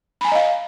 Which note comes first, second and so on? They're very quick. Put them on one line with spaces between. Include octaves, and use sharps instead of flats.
B5 G#5 A#5 D#5 F5